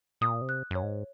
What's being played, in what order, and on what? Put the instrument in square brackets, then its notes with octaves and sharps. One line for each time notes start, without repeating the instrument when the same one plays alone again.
[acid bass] A#2 [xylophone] D#6
[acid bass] C3
[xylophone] F#6
[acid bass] F#2 [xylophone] C#5
[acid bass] G#2